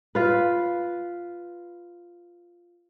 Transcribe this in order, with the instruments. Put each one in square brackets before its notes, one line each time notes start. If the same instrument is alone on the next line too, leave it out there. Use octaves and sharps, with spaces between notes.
[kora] F4 B4